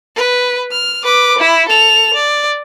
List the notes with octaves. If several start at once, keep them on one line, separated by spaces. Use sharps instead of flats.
B4
F6
B4 D6
E4
A4 F7
D5